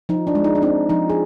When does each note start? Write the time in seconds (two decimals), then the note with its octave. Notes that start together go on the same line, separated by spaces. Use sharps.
0.09 F3 D#4
0.27 D4
0.35 G#3
0.44 D#4
0.55 D4
0.62 C4 D#4
0.89 F3 D#4
1.10 G#4